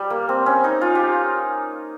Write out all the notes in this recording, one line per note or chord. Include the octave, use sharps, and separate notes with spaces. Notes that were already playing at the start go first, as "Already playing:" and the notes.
Already playing: G3
A#3
C4
C#4
D#4
F4
G4